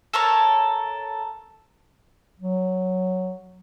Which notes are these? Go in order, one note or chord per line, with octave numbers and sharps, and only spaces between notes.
A4 A#4 C#5 A5
F#3